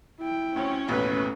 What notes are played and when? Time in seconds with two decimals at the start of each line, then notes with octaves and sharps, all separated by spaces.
0.20 E4 G5
0.56 D2 C4 C#4
0.88 A1 D#2 B2 A3 B4